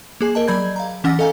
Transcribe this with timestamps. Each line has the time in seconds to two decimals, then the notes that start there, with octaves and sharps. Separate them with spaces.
0.21 A#3 G#4 G#5
0.35 A#4 D#5 A5
0.48 F#3 D5 B5 G6 G#6
0.76 F5 A#5
1.04 E3 C#4 F#5 E6 A#6
1.19 A4 D#5 F5 G#5 A#5